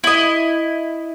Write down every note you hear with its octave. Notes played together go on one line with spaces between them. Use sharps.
E4 D#5